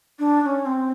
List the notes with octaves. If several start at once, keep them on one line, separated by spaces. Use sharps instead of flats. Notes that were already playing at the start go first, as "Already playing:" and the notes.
D4
D4
C#4
C4